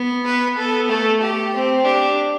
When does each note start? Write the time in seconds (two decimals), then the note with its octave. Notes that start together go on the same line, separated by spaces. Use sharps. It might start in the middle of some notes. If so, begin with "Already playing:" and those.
Already playing: B3
0.25 B4
0.57 B3 A4
0.89 A3 A4
1.21 G4
1.54 C4
1.85 D4 G4